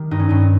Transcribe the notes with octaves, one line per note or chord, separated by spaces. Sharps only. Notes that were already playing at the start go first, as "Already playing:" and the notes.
Already playing: D#3 G4
G2 D#4
C#4
G2 D#4